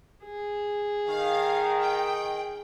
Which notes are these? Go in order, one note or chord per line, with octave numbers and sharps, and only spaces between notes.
G#4
D#3 F5
G5